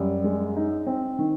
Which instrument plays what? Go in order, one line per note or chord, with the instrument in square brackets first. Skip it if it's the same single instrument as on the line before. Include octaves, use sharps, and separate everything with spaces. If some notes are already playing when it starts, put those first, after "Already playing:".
Already playing: [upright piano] F#2 G3
G#3
D#4
C4
D#3